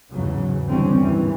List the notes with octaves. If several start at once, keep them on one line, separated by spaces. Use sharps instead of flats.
E2 G#2 C#3 F#3
D3 E3 G3 C4 C#4
D#2 G#2 E3